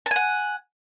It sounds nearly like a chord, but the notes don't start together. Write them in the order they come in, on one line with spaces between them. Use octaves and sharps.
A5 G#5 F#5